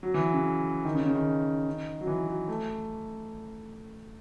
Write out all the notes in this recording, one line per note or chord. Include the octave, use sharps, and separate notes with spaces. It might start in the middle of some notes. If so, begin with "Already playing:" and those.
F#3
E3
C#3
D#3
C#3
C#3
D#3
F#3
E3
F#3
A3